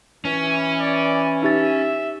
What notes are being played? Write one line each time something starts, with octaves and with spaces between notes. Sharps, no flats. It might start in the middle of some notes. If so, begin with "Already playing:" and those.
E3 C#4
D5
D#4 G4 E5 A6